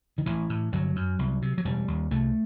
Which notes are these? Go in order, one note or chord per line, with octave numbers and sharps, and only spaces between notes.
D#3
A1 E3
A2
G1 F#3
F#2
C2
C3
F#3
E1 G3
D#2
C2 A3